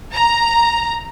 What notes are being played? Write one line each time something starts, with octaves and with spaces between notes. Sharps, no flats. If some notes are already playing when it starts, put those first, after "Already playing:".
A#5